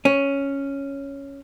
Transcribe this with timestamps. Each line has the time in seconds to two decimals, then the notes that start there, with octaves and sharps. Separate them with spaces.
0.05 C#4